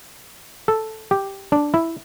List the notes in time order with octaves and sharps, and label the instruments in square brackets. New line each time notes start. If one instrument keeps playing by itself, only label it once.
[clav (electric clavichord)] A4
G4
D4
E4